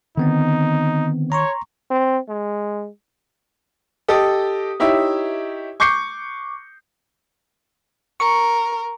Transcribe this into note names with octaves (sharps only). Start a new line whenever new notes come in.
D3 D#3 B3 C4 D#4
C#5 A#5 C6 C#6
C4
G#3
G4 A4 D#5 D#6
D#4 E4 G4 C#5 E5
C#6 D6 G6 C7 C#7
A#4 C#6 C#7